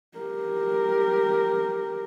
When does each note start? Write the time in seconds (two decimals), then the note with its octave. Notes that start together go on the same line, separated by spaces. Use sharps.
0.18 G4 A#4